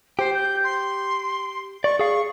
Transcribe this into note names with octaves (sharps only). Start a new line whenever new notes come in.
G4 C5
G6
C6
D5 C#6
G#4 F5 C#6